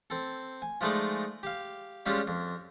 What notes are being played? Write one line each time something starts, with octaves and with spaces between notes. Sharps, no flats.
C4 A4
G#5
F3 G#3 A3 D#4 D5
G4 F5
G3 G#3 C#4 F4 G4
F2